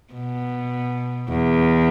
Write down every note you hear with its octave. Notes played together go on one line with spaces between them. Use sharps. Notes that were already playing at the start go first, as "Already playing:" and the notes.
B2
E2